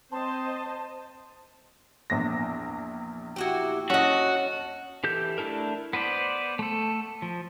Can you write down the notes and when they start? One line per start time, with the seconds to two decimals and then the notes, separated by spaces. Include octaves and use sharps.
0.12 C4 C5 D#5 A5
2.10 A#1 E2 A#6
3.36 E4 F#4 G4
3.90 C#4 F#4 A4 D#5 F#5
5.04 E3 G4 A4 G6
5.38 A3 D4 E4 A4 A#4
5.93 B3 B4 C5 D5
6.59 A3 A4
7.22 F3